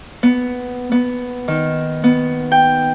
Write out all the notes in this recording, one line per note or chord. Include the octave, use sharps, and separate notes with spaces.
B3
B3
D#3
B3
G5